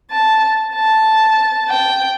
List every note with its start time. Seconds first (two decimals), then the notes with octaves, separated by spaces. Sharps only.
0.11 A5
0.75 A5
1.70 G5